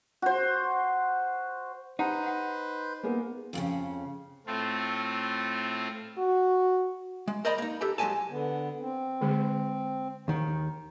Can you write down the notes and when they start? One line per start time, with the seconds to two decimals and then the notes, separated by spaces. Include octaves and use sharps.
0.22 F#4 C5
1.99 D#4 G4 B4 C5 F#5 A#5
2.26 F#5
3.03 A#3 B3 G#4
3.53 F2 A2 C#3
4.46 A2 A3 C4 F4
6.18 F#4
7.28 G#3
7.45 A#4 C5 D5 D#5 A#5 B5
7.58 A#3 D#4
7.81 D4 G4 A4
7.98 F#3 G#3 C4 G4 G#5 A5
8.30 D3 B3
8.80 C4
9.21 D3 G#3 G#4
10.28 D#2 D#3